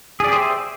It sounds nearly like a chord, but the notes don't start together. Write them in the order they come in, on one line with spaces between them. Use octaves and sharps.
G#4 D5 G4 C5 E5